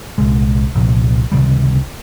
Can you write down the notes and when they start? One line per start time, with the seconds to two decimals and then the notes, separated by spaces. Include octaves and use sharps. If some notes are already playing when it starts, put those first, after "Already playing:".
0.18 C2 A#2 G#3
0.75 C2 A#2 F3
1.32 C#2 C3 D#3 G3